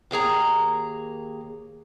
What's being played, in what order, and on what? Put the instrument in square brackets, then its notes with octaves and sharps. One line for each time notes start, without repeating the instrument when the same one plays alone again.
[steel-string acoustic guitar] D#2 A#3 G#4 A#5